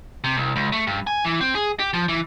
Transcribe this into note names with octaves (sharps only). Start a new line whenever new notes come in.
C3
C2
C#2
A3
G2
G#5
E3
C4
G#4
G4
F3
E3